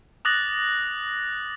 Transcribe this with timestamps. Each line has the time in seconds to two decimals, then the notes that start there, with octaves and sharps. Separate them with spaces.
0.25 D6 D#6 F#6 A6 A#6 F#7